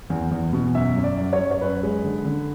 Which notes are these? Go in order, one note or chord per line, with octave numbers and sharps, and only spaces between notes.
E2
E2
B2
F#2 E5
F#2
D5
F#2
C#5
F#2
C#5
F#2 B4
G#3
D3
D3